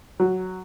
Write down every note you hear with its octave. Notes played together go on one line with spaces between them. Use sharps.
F#3